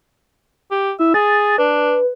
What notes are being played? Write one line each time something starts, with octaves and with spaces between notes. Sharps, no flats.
G4
E4 E5
G#4 A6
D4 B4